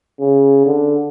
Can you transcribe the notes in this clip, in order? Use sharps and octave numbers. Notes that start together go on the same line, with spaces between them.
C#3
D3